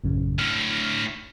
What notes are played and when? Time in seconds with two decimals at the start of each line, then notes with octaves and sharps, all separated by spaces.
0.04 A1 F#2 C#3
0.39 A2 D3 F6